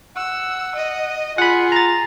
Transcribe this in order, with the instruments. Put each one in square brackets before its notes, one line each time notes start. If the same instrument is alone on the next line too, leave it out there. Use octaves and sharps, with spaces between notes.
[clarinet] F#5 [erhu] E6
[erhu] D#5
[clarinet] F4 [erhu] G#4 [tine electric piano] F#5 B5
[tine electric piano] A#5 A6